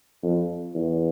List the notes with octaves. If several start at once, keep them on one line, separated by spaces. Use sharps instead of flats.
F2
E2